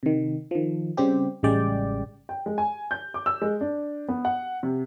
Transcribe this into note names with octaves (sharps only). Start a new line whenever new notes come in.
C3 D#3
D#3 F3
C#3 G3 C4 G4
A1 C#3 G3 G#3 D5 G5
G5
G#3
G#5
G6
D6
E6
G#3
D4
B3
F#5
C3